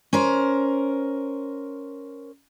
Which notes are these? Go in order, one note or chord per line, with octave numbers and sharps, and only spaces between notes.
C#4 A#4 C5